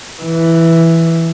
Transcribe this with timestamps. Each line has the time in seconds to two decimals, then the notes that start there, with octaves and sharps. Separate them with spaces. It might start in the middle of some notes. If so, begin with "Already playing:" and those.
0.22 E3